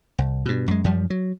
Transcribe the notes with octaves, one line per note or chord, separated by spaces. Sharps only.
C2
G2 B2
F#2 G#3
F#2 F3 G3
F#3